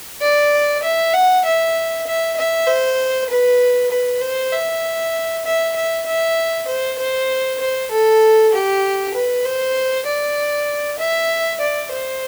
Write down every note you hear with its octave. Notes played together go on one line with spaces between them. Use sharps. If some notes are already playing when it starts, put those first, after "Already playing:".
D5
E5
F#5
E5
E5
E5
C5
B4
B4
C5
E5
E5
E5
E5
C5
C5
C5
A4
G4
B4
C5
D5
E5
D5
C5